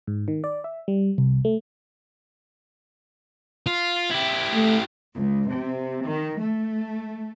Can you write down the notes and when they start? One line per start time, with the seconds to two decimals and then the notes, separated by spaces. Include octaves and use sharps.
0.07 G#2
0.28 D#3
0.44 D5
0.64 E5
0.88 G3
1.18 C2
1.45 A3
3.67 F4
4.11 E4 G4
4.54 A3
5.14 C#2
5.51 C3
6.05 D#3
6.41 A3